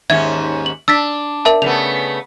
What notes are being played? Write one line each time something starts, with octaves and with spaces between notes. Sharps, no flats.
D#2 G#2 C#4 E5 G#6
F#7
D4 E6 A6 B6
A#4 E5 A5
C#3 A3 B3 F7